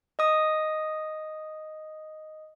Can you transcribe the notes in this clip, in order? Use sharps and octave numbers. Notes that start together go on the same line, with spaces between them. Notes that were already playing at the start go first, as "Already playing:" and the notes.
D#5 D#6